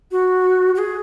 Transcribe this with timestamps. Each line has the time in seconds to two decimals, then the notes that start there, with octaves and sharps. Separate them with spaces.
0.11 F#4
0.75 F#4
0.78 G#4